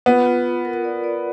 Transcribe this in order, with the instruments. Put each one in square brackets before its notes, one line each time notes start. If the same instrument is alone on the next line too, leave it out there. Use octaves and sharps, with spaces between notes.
[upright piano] B3 [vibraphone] F4
[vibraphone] F4
F4
A#4
D5
D5